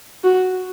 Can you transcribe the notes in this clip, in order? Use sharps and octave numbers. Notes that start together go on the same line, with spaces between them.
F#4